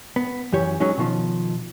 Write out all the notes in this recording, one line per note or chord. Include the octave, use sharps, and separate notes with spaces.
B3
F#2 E3 G4 C#5
F#3 G#3 C#4 D#4
B2 D#3 F3